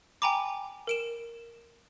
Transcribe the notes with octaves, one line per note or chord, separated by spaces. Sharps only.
G5 G#5 A#5 B5 D6
A#4 D7 E7